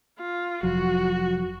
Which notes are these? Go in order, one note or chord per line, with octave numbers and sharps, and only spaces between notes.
F4
F1 F3 F#3 F#4